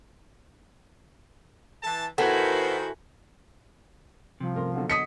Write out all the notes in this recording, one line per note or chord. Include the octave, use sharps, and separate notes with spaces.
E3 A5
D#3 B3 E4 F#4 A4 A#4 C5 G#5
C2 C3 F3
A1 A#4 C6
B2 D3 F#3
D#5 D#6 B6 C#7